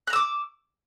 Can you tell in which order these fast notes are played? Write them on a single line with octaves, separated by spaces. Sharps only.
F#6 A#5 E6 D6